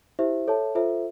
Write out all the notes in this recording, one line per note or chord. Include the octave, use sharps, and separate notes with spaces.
E4 G4 C5 E5
A4 C#5 E5 A5
F4 A4 C5 E5